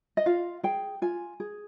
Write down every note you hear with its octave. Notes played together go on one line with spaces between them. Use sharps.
D#5
F4 F5
G#4 G5
F4 G#5
G#4